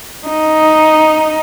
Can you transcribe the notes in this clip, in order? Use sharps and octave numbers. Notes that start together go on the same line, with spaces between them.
D#4